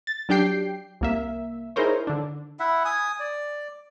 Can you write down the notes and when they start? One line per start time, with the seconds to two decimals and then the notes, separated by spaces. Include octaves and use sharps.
0.07 A6
0.29 F#3 D4 G4 G5 C7
1.01 C2 A#3 E5
1.76 D#4 E4 G#4 A#4 C5 C#5
2.07 D3 D4
2.60 E4 E5 F#5
2.85 G#5 D#6
3.20 D5